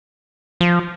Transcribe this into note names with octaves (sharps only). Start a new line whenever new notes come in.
F3